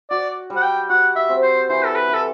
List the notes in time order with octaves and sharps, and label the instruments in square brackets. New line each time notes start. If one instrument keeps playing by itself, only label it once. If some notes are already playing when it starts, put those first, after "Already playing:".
[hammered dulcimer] F#4 [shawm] D5
[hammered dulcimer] G3
[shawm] F#5
G5
[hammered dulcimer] F#4 [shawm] F#5
[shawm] E5
[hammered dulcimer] C4
[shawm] C5
[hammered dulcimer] E3 [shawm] C5
[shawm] A4
B4
[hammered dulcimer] E3
[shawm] A4